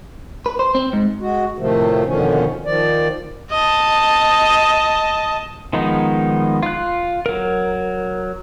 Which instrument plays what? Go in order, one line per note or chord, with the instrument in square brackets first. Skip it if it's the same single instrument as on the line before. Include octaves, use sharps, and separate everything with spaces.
[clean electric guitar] B4
C5
C4
G#2
[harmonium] G#3 F#4
A2 C3 D#3 F3 A3
F2 B2 D3 D#3 F3 C#4
D#3 F3 D5
[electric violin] D#5 A5
[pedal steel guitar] D#3 F3 G#3 B3 D#4
F4 F#6
F#3 A#4